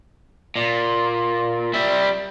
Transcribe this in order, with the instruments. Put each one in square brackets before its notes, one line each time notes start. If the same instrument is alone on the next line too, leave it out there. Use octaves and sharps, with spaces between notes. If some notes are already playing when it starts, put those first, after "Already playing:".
[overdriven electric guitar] A#2
G3 E5